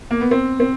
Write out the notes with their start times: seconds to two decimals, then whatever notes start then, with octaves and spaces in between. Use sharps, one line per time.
0.11 A#3
0.21 B3
0.31 C4
0.60 C4